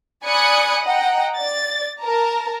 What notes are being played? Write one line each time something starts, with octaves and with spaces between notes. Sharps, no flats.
D5 G#5 B5 D#6 F#6 C#7
D#5 F#5 G5 A#5
D5 A6
A#4 A5 A#5